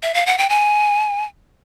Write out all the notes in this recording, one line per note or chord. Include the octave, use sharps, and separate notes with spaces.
E5
F5
F#5
G5
G#5